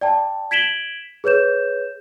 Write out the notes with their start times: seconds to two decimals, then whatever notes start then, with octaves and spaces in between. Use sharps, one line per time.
0.01 D5 G5 A5
0.51 G#6 B6 D7 E7 F#7 G7
1.24 G#4 B4 C#5 G6 E7